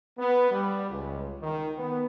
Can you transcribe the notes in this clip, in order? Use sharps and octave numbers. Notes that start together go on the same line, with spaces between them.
B3
G3
C#2
D#3
B3